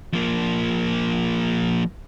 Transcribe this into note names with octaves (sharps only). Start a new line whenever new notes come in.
F3 A#3